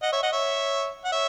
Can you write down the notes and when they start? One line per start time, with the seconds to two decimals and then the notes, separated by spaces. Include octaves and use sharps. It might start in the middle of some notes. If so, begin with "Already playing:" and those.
0.02 D#5 F#5
0.12 C#5 E5
0.22 D#5 F#5
0.32 C#5 E5
1.05 F#5
1.12 C#5 E5